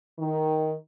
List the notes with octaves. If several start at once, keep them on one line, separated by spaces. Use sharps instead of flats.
D#3